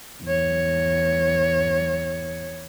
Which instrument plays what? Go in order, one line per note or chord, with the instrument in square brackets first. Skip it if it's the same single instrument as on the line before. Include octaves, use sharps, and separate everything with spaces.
[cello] E2 C#5